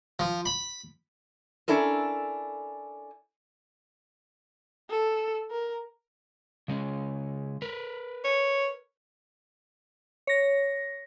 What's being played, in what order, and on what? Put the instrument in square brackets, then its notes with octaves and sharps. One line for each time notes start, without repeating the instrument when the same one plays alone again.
[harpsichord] F3
B5
[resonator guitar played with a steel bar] C#4 D4 E4 A4 A#4
[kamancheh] A4
A#4
[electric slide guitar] C#3 G#3 C#4
A#4 B4
[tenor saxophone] C#5
[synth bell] C#5 A#6